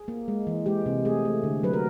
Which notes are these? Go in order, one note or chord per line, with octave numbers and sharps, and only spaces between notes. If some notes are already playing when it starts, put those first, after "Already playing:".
Already playing: G#4
A#3
G#3
E3
G#3 G4
C3
A3 G#4
A3
D3
F#3 B4
A#4